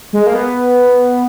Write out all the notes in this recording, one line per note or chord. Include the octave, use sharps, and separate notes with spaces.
G#3
A#3
B3